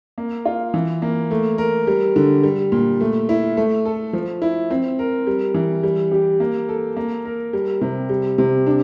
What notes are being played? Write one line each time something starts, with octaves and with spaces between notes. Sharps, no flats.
A#3
F4
E3
A#3
A3
A#4
G3
D3
G3
A#2
A3
E4
A3
A4
F3
E4
C4
A#4
G3
E3
G3
G4
A#3
A4
A#3
A#4
G3
C3
G3
C3
D4